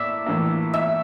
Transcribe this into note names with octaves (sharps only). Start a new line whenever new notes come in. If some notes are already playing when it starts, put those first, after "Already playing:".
Already playing: A2 A#3 D5 E5
A2 E3 A#3
E5